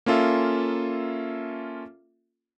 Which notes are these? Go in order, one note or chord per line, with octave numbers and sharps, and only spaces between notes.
A#3 C#4 F4 A4 E5